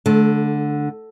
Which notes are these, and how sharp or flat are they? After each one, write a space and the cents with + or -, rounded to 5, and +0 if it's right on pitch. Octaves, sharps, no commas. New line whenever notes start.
D3 +0 A3 -35